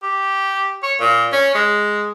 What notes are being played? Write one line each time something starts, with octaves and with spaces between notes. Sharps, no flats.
G4
C#5
A#2
C#4
G#3